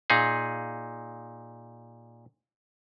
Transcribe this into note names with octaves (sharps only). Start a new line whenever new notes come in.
A#2 D#4 G#4